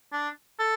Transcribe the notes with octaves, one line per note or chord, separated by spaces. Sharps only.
D4
A4